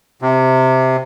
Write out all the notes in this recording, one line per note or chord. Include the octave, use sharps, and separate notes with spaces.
C3